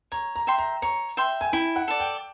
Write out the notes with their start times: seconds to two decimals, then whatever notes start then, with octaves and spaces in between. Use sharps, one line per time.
0.12 C#5 A#5
0.36 A#5
0.47 E5 G5 C6
0.58 A#5
0.82 C#5 A#5
1.17 E5 G5 C6
1.41 G#5
1.53 E4 G5
1.76 F#5
1.88 A4 D5
2.00 G5